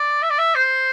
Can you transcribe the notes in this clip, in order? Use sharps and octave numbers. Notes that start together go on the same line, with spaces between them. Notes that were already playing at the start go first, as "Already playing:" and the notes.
Already playing: D5
E5
D5
E5
C5